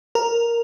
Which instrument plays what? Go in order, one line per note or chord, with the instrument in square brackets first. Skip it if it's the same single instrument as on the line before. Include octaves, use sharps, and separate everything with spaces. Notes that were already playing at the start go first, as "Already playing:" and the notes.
[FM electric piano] A#4